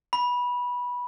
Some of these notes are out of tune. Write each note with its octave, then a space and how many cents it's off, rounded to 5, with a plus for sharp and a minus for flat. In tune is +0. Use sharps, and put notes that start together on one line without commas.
B5 -15